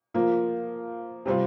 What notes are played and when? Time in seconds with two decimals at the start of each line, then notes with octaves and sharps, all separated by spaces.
0.14 F3 A#3 F4
1.26 C3 G3 C4 F4